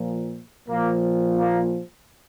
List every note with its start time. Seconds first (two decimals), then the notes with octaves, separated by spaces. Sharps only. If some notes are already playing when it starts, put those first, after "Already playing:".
Already playing: A#2 F3
0.68 A#2 F3 A#3
1.38 A#3